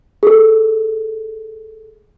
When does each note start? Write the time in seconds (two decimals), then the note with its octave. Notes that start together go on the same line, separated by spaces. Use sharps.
0.23 G#4 A4